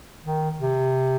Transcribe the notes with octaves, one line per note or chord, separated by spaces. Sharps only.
D#3
C3